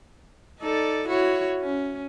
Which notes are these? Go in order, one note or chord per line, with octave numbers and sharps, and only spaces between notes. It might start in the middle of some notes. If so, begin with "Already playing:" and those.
D#4 A4 D5
E4 F#4 C#5
C#4